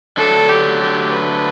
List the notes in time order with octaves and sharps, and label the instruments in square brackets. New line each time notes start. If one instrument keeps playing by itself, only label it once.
[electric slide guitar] D3 F#3 A3 D4 [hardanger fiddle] A4
[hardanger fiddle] G4
G4
B4